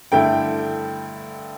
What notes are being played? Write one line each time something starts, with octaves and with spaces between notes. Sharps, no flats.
G2 D3 A3 E4 G5